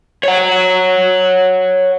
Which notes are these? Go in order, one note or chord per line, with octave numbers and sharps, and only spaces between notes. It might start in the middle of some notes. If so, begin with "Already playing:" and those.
C#5 F#5